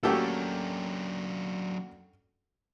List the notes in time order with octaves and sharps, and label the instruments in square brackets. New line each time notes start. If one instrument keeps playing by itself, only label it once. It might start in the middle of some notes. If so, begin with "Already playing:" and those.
[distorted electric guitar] F#3 D4 [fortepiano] A3 G4 A4 [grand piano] A#3 C#4 F#4